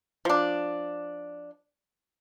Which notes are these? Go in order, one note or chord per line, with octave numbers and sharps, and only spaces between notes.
F3 D4